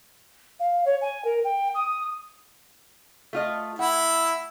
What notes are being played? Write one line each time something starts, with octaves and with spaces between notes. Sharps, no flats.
F5
C#5
G#5
A#4
G5
D#6
A3 F4 D#5
E4 F#5